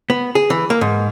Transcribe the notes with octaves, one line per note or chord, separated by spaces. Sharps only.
B3
G#4
E3
A#3
G#2